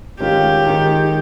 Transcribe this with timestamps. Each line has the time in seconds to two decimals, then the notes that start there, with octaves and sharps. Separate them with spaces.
0.20 D#3 G#3 C#4 F4 G4
0.67 D#3 G#3 D#4 G#4